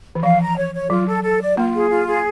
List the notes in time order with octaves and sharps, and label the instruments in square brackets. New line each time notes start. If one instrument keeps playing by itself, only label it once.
[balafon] E3
[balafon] F3 [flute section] F5
[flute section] A#5
C#5
C#5
[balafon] F#3 [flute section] F4
[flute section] A4
A4
D5
[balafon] A#3 [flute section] F4
[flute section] G#4
F4
G#4